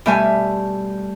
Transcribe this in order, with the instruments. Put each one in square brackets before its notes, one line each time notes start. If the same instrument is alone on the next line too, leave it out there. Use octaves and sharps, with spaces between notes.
[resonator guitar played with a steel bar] B2 E5 G#5 [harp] G3 A3 G4